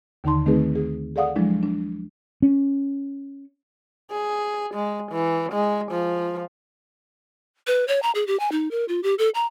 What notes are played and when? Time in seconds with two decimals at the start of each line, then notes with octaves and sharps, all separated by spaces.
0.24 D#2 D3 D#3 D#4 A5 C6
0.46 D#3 A3 C4 D#4 G#4 B4
0.75 G#4
1.16 G#4 A4 D5 F5 F#5 D#6
1.36 F3 F#3 G#3 D4 E4
1.63 D4
2.42 C#4
4.10 G#4
4.74 G#3
5.11 E3
5.52 G#3
5.91 F3
7.67 B4
7.88 C#5
8.03 A#5
8.15 G#4
8.27 G4
8.40 G#5
8.52 D#4
8.71 A#4
8.88 F4
9.03 G4
9.19 A4
9.35 A#5